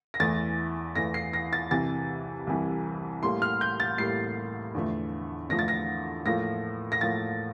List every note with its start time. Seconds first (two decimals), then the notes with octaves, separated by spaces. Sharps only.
0.14 A#6
0.20 E2 E3 A3 A6
0.96 E2 E3 A3 A#6
1.14 C7
1.33 A#6
1.53 A6
1.71 C2 C3 E3 G3 A6
2.47 C2 C3 E3 G3
3.23 A2 G3 A#3 C6
3.42 F6
3.61 G6
3.80 A6
3.98 A2 G3 A#3 C7
4.74 E2 D3 F3 A3
5.49 E2 D3 F3 A3 A#6
5.59 A6
5.68 A#6
6.25 A2 F3 A#3 A#6
6.92 A#6
7.01 A2 F3 A#3 A6